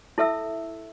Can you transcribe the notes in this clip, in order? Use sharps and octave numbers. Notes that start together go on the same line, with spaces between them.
E4 A4 E5 E6